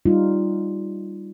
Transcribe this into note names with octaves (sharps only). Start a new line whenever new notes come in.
G3 D#4 F4